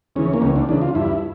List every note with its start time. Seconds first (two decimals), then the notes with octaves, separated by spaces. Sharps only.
0.15 C#3 E3 C#4
0.34 A#3
0.42 C#2 C#4
0.56 D4
0.69 C#3 E3 D4
0.81 F4
0.95 G2 E4